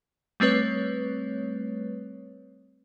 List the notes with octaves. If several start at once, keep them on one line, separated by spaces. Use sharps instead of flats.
G3 A3 C4 B4 C#5